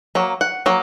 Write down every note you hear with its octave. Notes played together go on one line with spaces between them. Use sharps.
F#3 A#3
F#5
F#3 A#3